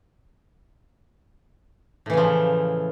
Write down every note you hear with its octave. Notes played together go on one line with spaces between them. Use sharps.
A2 C#3 E3 F3